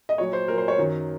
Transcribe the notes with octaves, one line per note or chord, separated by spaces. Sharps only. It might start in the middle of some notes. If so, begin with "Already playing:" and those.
D#5
A#2 F#3 C#5
C5
A#2 F#3 A#4
C5
C#5
F#2 D#3 F#3